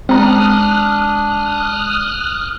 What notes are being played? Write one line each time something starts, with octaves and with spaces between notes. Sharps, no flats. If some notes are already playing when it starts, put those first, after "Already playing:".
G#3 C4 D4 A#5 D#6 F6 F#6